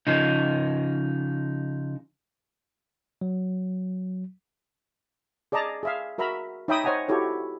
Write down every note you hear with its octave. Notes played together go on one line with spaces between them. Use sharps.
C#3 F3 D#4
F#3
G#4 D5 D#5 A5 A#5
G#4 E5 F5
F#4 A#4 E5 A#5 B5
D#4 C#5 E5 G5 B5 D#6
C5 C#5 D#5 F#5 G#5 A#5
E4 F#4 G4 A4 C#5